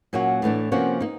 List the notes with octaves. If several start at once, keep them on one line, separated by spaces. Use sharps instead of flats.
A#2 F#3 A#3 C#4 F#4
A2 E3 A3 D4
C3 F3 A#3 C#4 F#4
A#3 D#4